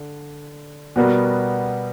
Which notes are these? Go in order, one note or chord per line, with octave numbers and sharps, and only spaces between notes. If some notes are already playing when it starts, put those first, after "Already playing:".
Already playing: D3
B2 G3 B3 F#4 A#4